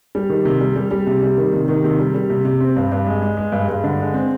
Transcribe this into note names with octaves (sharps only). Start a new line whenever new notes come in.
G3
D#3
C3
G3
G3
G3
C3
G3
D#3
C3
D#3
C3
G3
G3
C3
C3
C4
G2
G2
G#3
G#3
G#3
G2
G2
D3
G#3
C4